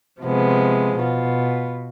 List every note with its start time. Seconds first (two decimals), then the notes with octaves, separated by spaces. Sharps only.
0.21 C3 F3 G#3 B3
0.96 B2 B3 F4